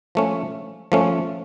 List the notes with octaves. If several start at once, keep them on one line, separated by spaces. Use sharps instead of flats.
F3 A3 C#4
F3 A3 C#4